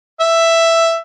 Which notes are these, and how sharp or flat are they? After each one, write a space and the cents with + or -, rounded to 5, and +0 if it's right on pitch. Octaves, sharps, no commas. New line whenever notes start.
E5 +5